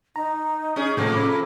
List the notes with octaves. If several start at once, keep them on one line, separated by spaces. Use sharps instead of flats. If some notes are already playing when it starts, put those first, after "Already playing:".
D#4 A#5
C#4 G#4
A2 C3 F3 A#3 A4
C#4 B5